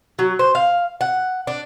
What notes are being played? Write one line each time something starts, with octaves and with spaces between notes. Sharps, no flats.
F#3
C5
F5
F#5
D4